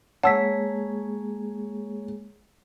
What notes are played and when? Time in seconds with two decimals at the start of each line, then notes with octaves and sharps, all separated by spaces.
0.24 G#3 A#3 G#4 C#5 F#5 A5 E6 B6